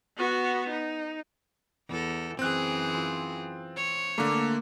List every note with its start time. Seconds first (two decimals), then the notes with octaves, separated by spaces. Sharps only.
0.18 B3 F#4
0.70 D#4
1.89 E2 A4
2.39 F#2 E3 C4 G#4 F#6
2.94 F4
3.76 C#5
4.18 D3 A3 A#3